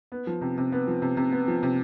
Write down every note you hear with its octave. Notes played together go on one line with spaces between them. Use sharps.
B3
F3
C3
C3
B3
F3
C3
C3
B3
F3
C3